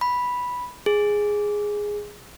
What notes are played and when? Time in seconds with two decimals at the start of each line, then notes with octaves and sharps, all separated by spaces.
0.01 B5
0.86 G#4